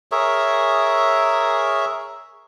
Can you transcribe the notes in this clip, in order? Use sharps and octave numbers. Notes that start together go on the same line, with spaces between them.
G#4 A#4 C#5 E5